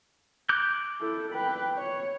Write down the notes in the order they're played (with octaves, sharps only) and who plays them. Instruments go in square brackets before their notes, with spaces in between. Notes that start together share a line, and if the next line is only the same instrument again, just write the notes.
[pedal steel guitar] D6 F#6 G6
[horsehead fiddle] E4 A4
B4 G5
C#5